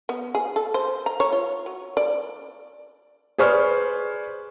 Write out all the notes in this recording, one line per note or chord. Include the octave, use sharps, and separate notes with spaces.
B3
G#4
A4
C5
A#5
C#5
F4
F#3
D5
G#4 B4 C5 D5 C#6 F6